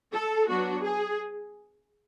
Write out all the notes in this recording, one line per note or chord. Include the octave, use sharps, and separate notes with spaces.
A4
F#3 B3 D4 F#4
G#4